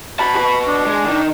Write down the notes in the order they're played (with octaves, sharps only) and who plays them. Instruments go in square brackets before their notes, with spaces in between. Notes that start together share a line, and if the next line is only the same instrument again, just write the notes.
[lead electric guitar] F#4 A5 [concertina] B5
[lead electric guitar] F#4 B4
[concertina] D4
[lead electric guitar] G#3
D#3 D#4